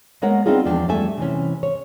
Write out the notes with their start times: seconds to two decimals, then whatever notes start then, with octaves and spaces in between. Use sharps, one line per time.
0.22 G#3 A#3 B3 A#4 C#5 F#5
0.46 B3 C4 D4 D#4 F4 G#4
0.65 E2 F3 D4 G5
0.88 F2 G3 A3 A4 E5 G#5
1.18 C3 E3 C#4
1.63 C#5